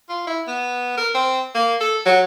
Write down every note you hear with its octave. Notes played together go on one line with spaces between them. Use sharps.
F4
E4
B3
A#4
C4
A#3
A4
F#3